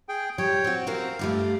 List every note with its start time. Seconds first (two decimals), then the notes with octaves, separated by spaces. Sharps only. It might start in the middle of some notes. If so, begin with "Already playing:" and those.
0.09 G#4 G5
0.38 G3 C#5 G5
0.64 C4 F#4
0.87 C4 F#4 A#4 F5
1.19 G2 G3 A3